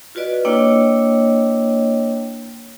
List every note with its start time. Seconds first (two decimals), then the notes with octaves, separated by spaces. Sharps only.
0.15 F4 F#4 B4 D5 D#5
0.45 A#3 D4 E4 C#5 D#5 G5